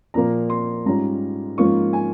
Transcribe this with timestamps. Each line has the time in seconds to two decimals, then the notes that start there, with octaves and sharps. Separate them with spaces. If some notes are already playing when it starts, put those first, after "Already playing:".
0.14 A#2 F3 A#3 A#5
0.50 C6
0.86 G#2 G3 C#4 F4 A#5
1.58 G#2 F3 A#3 C#4 F4 C#6
1.93 G#5